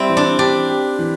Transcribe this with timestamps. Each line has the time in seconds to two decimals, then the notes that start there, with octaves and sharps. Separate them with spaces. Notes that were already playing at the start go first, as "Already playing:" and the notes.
Already playing: G3 C4 E4
0.09 E3
0.17 D4
0.39 D4 G4
0.69 G4
0.99 E3